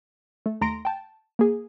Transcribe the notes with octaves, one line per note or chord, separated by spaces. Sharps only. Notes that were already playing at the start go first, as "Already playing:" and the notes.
A3
D#2 A3 A#5 C6 A#6 D7
G5 A5
A#3 G#4